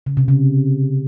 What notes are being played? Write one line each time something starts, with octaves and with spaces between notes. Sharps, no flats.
C#3
C3
C#3